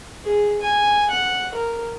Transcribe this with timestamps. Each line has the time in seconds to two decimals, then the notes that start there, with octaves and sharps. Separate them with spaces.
0.24 G#4
0.61 G#5
1.10 F#5
1.54 A#4